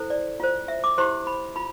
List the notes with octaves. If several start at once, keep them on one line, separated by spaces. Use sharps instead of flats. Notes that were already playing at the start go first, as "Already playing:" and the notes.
Already playing: E4 A4 C5
D5
F4 C5
E5
D6
E4 G4 C5 C6
B5
F4 B5